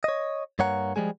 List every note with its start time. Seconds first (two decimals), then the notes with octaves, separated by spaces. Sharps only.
0.04 C#5 D#5
0.59 G2 A#3 C#5 F#5 A#5
0.96 F3 G3 G#3 G#4